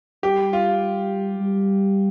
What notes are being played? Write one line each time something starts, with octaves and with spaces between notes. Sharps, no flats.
G3 G4
F4
G3